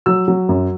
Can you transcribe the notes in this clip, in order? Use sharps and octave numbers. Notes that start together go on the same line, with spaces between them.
F#3 E6
F#3
F#2